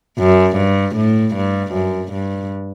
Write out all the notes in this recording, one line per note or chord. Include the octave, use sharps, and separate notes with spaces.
F#2
G2
A2
G2
F#2
G2